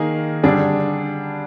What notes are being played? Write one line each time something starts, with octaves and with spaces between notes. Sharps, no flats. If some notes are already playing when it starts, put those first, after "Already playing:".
Already playing: D#3 A#3 D#4 G#4
D3 G3 D4 G#4